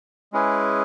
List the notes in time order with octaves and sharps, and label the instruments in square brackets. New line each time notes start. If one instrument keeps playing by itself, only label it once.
[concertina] G#3 C#4 E4 G#4 B4